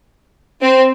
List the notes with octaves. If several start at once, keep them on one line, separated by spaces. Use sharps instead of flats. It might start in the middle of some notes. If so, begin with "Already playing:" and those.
C4